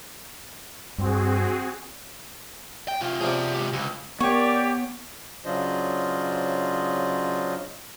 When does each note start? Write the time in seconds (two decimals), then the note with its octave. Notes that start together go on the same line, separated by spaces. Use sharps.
0.98 G2 C4 F#4 G#4
2.88 G5
3.01 C3 F4
3.21 C3 F3 G#4 D5
3.54 G#3 G4
3.73 C#2
4.20 B3 G4 A#4 C#5 D5
5.45 C#3 F#3 D4 F4 C5 D#5